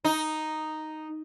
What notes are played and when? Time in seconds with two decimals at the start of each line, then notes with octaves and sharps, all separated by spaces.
0.04 D#4